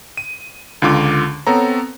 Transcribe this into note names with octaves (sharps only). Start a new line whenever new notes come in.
D#7
C#2 D3 F4 D6
B3 C4 A4 C#5 A#5